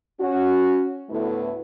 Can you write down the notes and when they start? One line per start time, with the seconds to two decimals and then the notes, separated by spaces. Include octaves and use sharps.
0.21 C#4 F#4
1.10 D2 A2 A3 B3 E4 B4